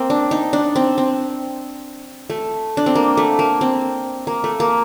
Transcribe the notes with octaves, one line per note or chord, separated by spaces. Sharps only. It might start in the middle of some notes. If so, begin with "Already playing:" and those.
Already playing: A#3 C4
D4
D#4
D4
C4
C4
A3
D4
C4
A#3
A3
A#3
C4
A#3
A3
A#3